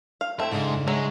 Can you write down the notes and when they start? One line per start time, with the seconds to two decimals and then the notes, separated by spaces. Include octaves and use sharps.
0.21 F5
0.40 A3 C4 E4 E5
0.52 G#2 C#3 D4 D#5
0.88 F#3 G#3 E4